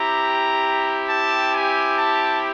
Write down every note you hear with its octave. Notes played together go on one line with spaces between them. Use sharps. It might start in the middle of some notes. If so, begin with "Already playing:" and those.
Already playing: C4 E4 G4 A#5
A5
G#5
A5